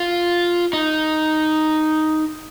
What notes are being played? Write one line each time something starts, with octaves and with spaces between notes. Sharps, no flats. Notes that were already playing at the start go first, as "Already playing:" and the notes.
Already playing: F4
D#4